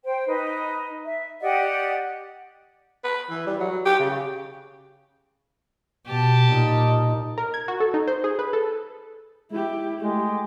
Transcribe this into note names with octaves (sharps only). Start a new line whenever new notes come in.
C5 G5
D#4 B4 D#5
E5
G4 D5 D#5 F#5
B4
E3
G3
F#3
G4
C#3
B2 G4 A5
A#2 D#4
A#4
G#6
F#4
A4
D#4
C5
G#4
B4
A4
G#3 E4 G4
G#3 A3 G4